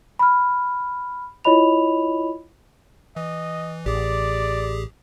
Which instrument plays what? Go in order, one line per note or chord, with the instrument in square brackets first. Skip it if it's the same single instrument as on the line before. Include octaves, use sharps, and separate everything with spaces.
[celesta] B5 F6
E4 F4 C#5 D#5 B5 F7
[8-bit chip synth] E3 [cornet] D#5
[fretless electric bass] A1 [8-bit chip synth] G4 G#4 [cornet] D5